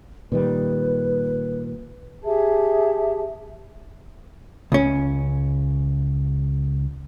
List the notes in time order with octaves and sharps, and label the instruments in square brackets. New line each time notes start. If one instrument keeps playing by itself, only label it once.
[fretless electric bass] A#2 D#3 G3 [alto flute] B4
[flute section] G4 G#4 E5 A5
[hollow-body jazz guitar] C#2 C#4